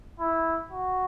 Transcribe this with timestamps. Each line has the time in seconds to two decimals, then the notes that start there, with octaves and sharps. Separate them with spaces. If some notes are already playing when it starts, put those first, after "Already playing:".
0.20 E4
0.72 F#4